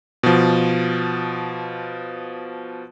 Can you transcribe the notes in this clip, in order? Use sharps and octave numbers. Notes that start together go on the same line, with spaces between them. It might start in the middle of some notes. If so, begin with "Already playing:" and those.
B2 F3